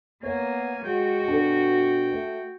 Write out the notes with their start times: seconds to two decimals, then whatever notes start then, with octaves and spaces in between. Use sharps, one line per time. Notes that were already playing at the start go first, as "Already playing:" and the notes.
0.23 A#3 B3 C#5 G#5
0.84 G#3 F#4 G5
1.28 B2 D4 A4
2.12 A3